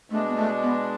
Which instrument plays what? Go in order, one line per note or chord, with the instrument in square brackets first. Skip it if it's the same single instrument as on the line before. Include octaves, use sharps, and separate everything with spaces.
[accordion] B2 G#3 D4 [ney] A3
[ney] B3
A3
B3